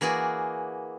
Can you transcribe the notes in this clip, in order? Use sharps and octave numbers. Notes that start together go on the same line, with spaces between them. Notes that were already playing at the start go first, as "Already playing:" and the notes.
E3 A#3 F#4 G#4 D5